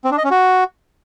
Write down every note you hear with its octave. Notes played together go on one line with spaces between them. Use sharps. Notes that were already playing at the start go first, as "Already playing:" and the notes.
C4
D4
D#5
C#4
F#4